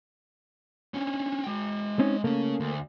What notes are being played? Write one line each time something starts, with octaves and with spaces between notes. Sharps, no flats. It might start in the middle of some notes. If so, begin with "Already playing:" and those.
C4 C#4
G#3 G5
C4 C#4 D#4
C#3 A3 A#3 C#4
D2